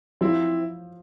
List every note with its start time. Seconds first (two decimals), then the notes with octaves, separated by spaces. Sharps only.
0.21 F3 C4 E4